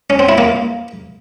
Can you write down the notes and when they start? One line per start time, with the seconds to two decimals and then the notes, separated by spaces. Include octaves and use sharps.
0.10 C#4
0.19 C4
0.29 E4
0.38 A#3